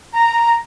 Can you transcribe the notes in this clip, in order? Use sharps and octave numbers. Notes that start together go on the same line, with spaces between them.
A#5